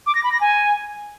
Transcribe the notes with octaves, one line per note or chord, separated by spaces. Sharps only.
D6
A#6
B5
A#6
G#5